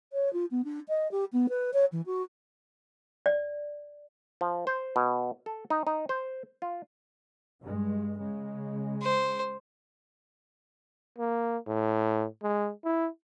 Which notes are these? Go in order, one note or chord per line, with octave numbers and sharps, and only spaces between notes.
C#5
F4
B3
D4
D#5
G4
B3
B4
C#5
E3
F#4
D5
F3
C5
B2
A4
D#4
D#4
C5
F4
G2 G#3
C#3 G#3
C5
A#3
A2
G#3
E4